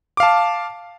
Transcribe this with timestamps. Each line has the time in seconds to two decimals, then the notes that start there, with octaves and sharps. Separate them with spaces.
0.17 D6
0.20 F5
0.23 A5